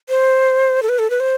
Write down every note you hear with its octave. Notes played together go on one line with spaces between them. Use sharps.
C5
A4
B4
A4
B4
C5